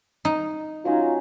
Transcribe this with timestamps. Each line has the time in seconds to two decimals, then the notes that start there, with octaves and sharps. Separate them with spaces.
0.25 D#4
0.85 F#3 C#4 D#4 F4